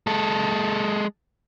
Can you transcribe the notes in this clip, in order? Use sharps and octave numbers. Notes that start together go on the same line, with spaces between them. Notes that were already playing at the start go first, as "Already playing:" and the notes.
G#3 A4